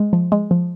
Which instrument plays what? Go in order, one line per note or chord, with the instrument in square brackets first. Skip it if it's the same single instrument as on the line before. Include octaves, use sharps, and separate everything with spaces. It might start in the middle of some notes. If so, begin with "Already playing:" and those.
Already playing: [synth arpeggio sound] G#3
F3
G#3
F3